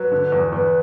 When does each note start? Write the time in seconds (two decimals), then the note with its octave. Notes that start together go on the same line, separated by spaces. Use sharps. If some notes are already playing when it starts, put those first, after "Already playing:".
Already playing: F#3 B4
0.12 D3
0.32 E2
0.52 E2 B4